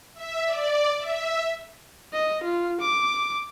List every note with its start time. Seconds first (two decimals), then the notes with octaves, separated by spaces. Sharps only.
0.14 E5
0.45 D5
0.98 E5
2.13 D#5
2.44 F4
2.81 D6